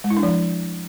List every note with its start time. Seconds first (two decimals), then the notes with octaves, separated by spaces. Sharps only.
0.04 G#3
0.10 E4
0.17 D4
0.23 F3